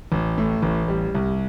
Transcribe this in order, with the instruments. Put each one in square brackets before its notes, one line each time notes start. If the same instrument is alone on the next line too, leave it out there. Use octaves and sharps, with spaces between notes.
[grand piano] A1
A2
A1
G3
C2